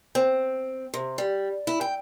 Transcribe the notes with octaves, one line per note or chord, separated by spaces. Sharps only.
C4
C3
G3
E4
G5